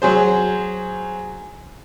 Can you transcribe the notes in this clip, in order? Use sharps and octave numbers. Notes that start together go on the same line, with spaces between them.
F#3 G#4 C5